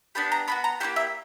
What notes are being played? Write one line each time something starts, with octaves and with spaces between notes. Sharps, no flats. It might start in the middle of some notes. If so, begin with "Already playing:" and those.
B3 D4 G4 B5
A#5
B3 D4 F#4 B5
A#5
A#3 C#4 E4 G4 F#5
E5